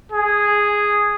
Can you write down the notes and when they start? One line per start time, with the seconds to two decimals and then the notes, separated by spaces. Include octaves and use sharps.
0.12 G#4